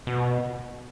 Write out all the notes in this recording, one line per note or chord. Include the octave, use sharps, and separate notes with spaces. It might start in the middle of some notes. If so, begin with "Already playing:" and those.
B2